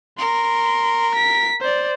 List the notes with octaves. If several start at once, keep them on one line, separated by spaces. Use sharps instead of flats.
A#4 C6
B6
C5 D5